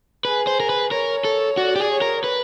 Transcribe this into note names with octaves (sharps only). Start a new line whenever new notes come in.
G#4 B4
C5
A#4
B4
A#4 C#5
A4
F#4 D5
G4
G#4
C#5
A#4
B4